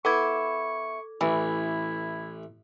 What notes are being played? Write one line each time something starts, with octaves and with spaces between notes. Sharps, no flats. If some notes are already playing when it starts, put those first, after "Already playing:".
B3 E4 A4 C#6 D6 G#6
A1 E3 E4